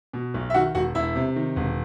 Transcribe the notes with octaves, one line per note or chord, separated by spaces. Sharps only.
B2
B1
E5
D#3 F#4 F#5
E1 F#4 F#5
E1 E4 E5
C3
D#3
E1